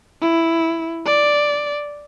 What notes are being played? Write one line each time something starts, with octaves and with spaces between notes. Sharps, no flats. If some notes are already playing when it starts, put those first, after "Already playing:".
E4
D5